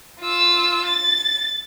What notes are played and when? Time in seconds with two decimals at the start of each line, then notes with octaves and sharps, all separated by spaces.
0.21 F4 E6
0.86 A6